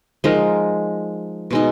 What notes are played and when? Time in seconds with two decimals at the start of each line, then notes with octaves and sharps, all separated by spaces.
0.24 F3 G#3 D#4 A#4
1.51 B2 G#3 D#4